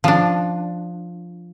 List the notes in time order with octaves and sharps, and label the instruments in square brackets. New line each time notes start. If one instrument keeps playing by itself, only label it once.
[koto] F3 D4